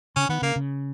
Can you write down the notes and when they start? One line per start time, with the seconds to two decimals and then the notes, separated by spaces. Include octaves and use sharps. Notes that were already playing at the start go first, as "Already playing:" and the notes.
0.16 C#3 C#4
0.29 D#3 B3
0.42 C#3 A#3
0.56 C#3